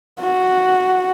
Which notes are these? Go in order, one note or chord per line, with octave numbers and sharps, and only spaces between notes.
F#4